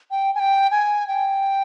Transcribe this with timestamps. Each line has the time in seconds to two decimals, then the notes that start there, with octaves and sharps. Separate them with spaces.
0.11 G5
0.35 G#5
0.39 G5
0.71 G#5
1.08 G5